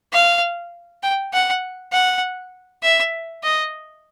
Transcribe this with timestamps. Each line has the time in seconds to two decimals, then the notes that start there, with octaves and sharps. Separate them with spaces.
0.13 F5
1.03 G5
1.33 F#5
1.92 F#5
2.83 E5
3.43 D#5